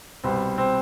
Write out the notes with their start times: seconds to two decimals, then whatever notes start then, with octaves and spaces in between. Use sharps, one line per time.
0.24 C2 B2 G3 C4
0.58 C4